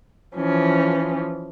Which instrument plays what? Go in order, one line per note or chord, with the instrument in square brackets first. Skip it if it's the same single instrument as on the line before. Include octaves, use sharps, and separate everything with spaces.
[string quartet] E3 F3 C#4